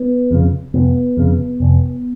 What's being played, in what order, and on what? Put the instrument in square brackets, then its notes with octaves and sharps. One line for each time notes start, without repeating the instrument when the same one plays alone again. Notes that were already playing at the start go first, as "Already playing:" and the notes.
Already playing: [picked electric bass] B3
F2 C#3
F1 B3
F2 C#3
F1